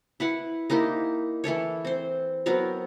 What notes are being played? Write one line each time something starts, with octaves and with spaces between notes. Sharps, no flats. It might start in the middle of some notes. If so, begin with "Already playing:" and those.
E4 B4 F#5
A#3 D#4 E4 G4
E3 E4 A4 C#5
C4 C5
F#3 B3 C4 A#4